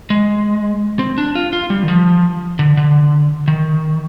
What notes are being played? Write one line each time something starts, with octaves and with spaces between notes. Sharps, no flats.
G#3
C4
D4
F4
F4
G3
D#3
F3
D3
D3
D#3